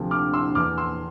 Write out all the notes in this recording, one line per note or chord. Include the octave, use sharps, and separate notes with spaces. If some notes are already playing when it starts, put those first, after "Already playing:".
Already playing: D2 C3 F3
D6 F6
C6 E6
E2 E3 D6 F6
C6 E6